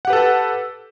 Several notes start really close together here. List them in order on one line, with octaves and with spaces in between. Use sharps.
F#5 G4 B4 A4